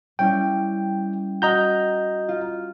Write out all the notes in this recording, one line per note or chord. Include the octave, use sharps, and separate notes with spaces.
G3 C#4 E4 G5
F#4 D#5 A#5 G6
F4